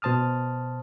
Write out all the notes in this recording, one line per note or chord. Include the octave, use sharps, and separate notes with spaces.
B2 C5 A5 D#6 F6